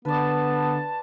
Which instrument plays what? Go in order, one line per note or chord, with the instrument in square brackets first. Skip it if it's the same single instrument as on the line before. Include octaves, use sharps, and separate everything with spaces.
[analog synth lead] D3 [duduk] B3 [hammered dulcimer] B4 D5 [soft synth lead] A5